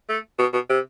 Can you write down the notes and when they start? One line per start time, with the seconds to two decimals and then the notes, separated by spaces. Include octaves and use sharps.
0.09 A3
0.39 B2
0.53 B2
0.69 C3